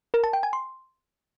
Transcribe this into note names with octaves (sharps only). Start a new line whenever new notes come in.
A#4
A5
G5
G#5
C6